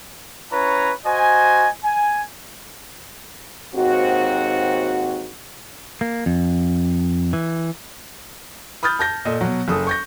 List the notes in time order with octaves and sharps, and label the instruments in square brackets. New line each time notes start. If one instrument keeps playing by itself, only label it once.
[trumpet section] C#4 E4 B4 C#5 A#5
F#4 C5 D#5 G#5
G#5
[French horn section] D#2 G#2 C4 F#4
[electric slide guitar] A#3
F2
E3
[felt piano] B5 D#6 F6 G6 A6
A5 G6 A#6
A#2 A4 D#5
B2 F#3
F#1 A4 D#6
C#6 G6 A#6